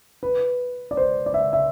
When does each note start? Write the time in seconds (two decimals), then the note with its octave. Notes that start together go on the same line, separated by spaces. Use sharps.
0.23 B4
0.91 D5
0.97 C5
1.26 D5
1.34 E5
1.53 E5